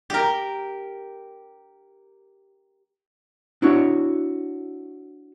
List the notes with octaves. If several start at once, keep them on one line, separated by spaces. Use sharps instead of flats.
G4 A#4
D4 E4 F#4 C#5